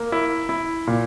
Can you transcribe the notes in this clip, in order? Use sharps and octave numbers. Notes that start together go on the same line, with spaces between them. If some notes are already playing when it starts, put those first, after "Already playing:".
Already playing: A#3
E4
E4
A#2